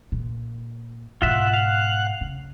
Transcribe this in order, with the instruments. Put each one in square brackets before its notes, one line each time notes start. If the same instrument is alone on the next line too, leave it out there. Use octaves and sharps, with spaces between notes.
[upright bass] A#2
[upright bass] G#2 B2 [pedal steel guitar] F4 E5 [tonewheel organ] F#5 F#6
[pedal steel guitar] F5
[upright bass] C#3